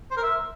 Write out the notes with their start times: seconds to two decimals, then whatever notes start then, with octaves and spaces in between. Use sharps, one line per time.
0.11 C5
0.17 A#4
0.23 E5